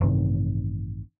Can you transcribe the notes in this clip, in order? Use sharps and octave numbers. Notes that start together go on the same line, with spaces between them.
A1 G2 C3 D#3